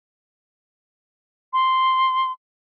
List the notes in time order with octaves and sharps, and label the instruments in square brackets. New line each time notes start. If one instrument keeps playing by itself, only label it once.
[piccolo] C6